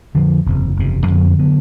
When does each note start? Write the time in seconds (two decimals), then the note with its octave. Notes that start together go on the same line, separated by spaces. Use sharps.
0.15 F2 D3 F3
0.46 F#1 E2 C3
0.76 F#1 E2 C3
1.08 F2 D3 F#3 B3
1.39 D3 F#3 B3